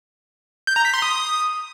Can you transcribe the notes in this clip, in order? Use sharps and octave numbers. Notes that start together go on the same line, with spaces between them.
G6
A#5
B6
C6
D#6